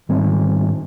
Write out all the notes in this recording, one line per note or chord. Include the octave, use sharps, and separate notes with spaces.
G#2 D#3 G3 C4